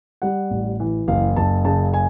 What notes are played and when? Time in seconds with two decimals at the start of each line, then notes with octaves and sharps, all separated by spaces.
0.22 G3 F#5
0.51 A1
0.80 E3
1.08 F#1 F5
1.36 F#1 A5
1.65 C#3 A5
1.94 G#5